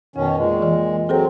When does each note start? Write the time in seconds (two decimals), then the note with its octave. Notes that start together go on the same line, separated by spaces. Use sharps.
0.16 F2 B2 D#3 C#4
0.37 A#2 G#3
0.62 E3
1.09 F#3 C4 G#4 A4 C5